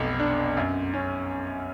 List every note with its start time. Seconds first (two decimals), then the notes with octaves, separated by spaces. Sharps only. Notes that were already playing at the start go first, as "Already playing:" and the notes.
Already playing: F1 B1 B3
0.19 D4
0.57 F#2
0.94 C#4